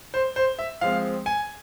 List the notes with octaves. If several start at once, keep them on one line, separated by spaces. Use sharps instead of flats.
C5
C5
E5
F3 G#3 C4 F5
G#5